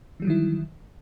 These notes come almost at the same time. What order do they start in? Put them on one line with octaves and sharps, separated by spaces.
E3 G3 F#3 D#3 E4